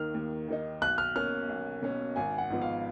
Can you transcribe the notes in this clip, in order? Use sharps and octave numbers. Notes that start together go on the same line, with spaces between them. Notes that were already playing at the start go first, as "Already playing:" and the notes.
Already playing: D#2 D#3 A#3 D#4 F6
D#2
D#3 A#3 D#4
B1 F#6
F6
B2 A#3 C#4 F6
B1
B2 A#3 C#4
G#1 G#5
F#5
G#2 F3 B3
F5